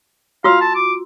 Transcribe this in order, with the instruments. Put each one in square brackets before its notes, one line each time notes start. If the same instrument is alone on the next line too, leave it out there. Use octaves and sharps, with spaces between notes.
[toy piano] F4 F#4 E6 [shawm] F5
[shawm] A5
D6